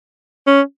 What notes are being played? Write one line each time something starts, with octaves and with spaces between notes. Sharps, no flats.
C#4